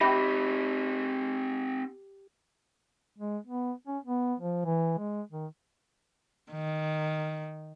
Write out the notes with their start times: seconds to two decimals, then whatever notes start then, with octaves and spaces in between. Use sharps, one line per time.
0.01 C4 D#4 G4 E5 B5
3.18 G#3
3.47 B3
3.87 C#4
4.05 B3
4.40 F3
4.65 E3
4.99 G#3
5.32 D#3
6.51 D#3